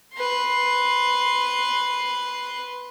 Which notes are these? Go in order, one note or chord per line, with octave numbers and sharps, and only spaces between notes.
B4 C6